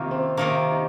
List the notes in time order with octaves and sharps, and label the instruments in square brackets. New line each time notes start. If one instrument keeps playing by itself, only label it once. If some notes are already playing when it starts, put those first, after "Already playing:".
Already playing: [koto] C3 D#3 A#3 [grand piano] F4 G4
[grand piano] C4
[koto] C3 D#3 A#3 [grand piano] C4
[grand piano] D#4